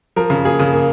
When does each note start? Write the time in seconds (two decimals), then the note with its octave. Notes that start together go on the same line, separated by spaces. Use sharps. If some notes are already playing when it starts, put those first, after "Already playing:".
0.16 F3 A#4
0.30 C#3
0.45 A#3 G#4
0.59 C#3
0.72 A#3